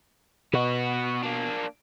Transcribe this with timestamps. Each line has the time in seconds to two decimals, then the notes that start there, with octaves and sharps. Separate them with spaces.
0.53 B2 B3 F#4
1.23 A#3 D4